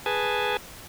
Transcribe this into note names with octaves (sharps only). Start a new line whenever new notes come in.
G#4 B4 G#5 A5